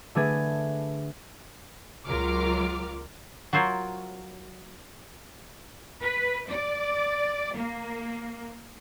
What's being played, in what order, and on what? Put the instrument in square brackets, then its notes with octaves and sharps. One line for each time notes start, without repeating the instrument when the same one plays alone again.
[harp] D3 A3 D4 G#4 B4 G#6
[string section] C#2 F#3 F4 A#4 D6 F6
[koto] F#3 F4 A#4 C5 C#5
[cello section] B4
D5
A#3